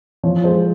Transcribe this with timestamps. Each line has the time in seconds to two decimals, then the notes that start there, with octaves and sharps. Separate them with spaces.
0.23 F3 C#5
0.44 G#3 C5